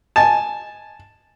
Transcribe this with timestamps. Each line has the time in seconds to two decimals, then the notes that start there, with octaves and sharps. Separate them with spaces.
0.16 G#5 A5